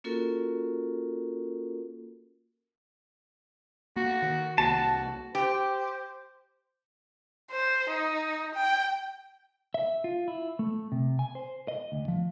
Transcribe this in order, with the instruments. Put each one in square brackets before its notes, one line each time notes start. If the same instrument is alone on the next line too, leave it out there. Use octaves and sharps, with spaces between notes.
[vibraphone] A#3 C#4 F4 F#4 A4 A#4
[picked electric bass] A#3 [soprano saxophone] F#4
[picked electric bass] D#3
[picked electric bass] C2 A#3 [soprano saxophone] F#4 [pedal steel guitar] A5
[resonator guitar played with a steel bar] G4 [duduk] C5
[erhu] C5
D#4
G5
[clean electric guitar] E5
F4
E4
A3
C3
G#5
C5
D#5
D2
F3